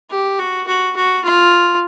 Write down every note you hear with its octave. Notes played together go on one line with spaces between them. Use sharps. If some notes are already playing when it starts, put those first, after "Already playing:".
G4
F#4
F#4
F#4
F4